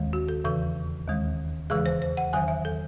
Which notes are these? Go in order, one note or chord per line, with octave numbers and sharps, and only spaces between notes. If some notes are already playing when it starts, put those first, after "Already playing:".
Already playing: D#2 D#3 G#3
F#4
A4
E2 C#3 E3 A4
D#2 D#3 G#3
E2 C#3 E3 G#3 G#4
C5
C5
F#5
E2 D#3 F#3 G#5
E5
A4